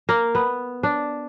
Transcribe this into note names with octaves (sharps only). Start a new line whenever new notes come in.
A#3
B3
D4